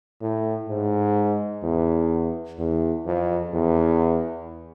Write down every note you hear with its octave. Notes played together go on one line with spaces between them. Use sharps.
A2
G#2
E2
E2
F2
E2